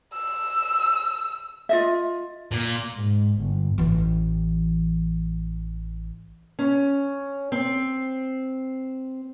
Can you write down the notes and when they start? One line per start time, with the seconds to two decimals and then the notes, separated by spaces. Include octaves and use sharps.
0.13 E6
1.69 F4 D#5 E5
2.51 A#2
2.94 G#2
3.39 G1
3.78 A1 E3
6.59 C#4
7.52 C4